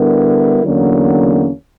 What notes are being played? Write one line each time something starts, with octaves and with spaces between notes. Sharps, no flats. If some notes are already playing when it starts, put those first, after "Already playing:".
Already playing: D3 G3 B3 E4 A#4
E2 D3 F#3 A#3 C#4